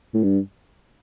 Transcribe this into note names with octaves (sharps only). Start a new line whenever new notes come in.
A2
G2